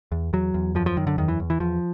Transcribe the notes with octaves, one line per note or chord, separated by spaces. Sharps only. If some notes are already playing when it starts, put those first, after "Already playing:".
E2
E2 F#3
E2
F#2 F3
F3
F#2 D#3
D3
E2 D#3
E3
E2
E3
E2 F3